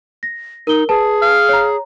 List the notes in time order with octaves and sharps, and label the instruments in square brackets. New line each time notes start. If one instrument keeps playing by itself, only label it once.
[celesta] A#6
[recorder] D#4 [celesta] A#4 G7
[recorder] G#4 [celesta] B4 A5
[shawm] F5
[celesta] C#5 A#5